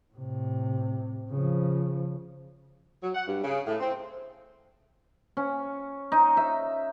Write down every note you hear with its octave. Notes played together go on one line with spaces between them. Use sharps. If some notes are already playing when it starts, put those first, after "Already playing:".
A2 C3
C#3 F3
F#3
F#5
G2
C#3
A2
C4
C#4
D#4
E5